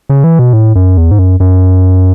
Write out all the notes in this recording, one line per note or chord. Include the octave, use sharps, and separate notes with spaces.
C#3
E3
B2
A2
F#2
E2
G#2
F#2
F#2